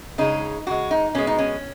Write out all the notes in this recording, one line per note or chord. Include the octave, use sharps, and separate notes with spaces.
C#3 G#3 D#4
C#3 G#3 F#4
D#4
B2 G#3 C#4
D#4
C#4